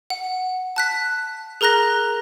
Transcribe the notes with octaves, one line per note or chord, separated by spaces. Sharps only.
F#5
A5 F#6 B6
G#4 A#4 A#5 F#6 A#6